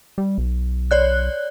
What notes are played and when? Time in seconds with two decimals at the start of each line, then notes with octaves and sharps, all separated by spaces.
0.18 G3
0.38 B1
0.91 C#5 D5 F#6